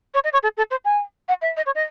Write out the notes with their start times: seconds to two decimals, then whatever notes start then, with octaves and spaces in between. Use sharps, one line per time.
0.14 C#5
0.24 D#5
0.33 C#5
0.43 A4
0.57 A4
0.71 C5
0.85 G#5
1.28 F#5
1.42 E5
1.57 D#5
1.66 C#5
1.75 D#5